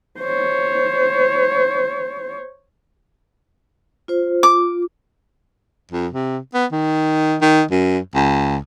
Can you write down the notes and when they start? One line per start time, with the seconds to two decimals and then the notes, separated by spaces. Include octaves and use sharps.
0.20 C5 C#5
4.08 F4 C5
4.43 F4 D6
5.91 F2
6.13 C3
6.54 B3
6.72 D#3
7.42 D#3
7.71 F#2
8.15 C#2